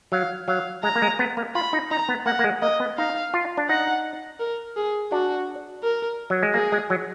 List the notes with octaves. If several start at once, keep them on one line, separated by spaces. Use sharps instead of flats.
F#3 F5
F#3 F5
G#3 A#5
A#3
G#3
B3
A#3
F4 B5
D#4
D#4 A#5
B3
A#3 F#5
A#3
G#3
A#3 D#5
B3
D#4 F5
F4
D4
D#4 F#5
A#4
G#4
D4 F#4
A#4
F#3
G#3
A#3 G#4
G#3
F#3